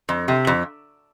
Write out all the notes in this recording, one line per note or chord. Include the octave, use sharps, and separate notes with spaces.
F2
C3
F2